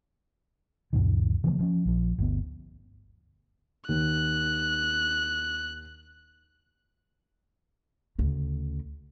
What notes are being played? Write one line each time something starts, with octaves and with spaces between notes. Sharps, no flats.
C#2 F#2 A#2 D#3
C#3 E3 F3 A#3
F3 C4 C#4
A#1 F3
G1 D2 B3
D#2 F#6
D2 C#3